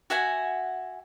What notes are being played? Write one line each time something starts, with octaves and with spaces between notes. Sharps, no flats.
F#4 E5 F#5 G#5